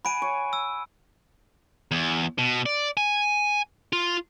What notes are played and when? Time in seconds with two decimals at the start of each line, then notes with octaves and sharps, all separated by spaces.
0.05 F#5 G#5 B5 D7 D#7
0.22 C#5
0.53 E6
1.91 E2
2.38 B2
2.66 D5
2.97 G#5
3.93 F4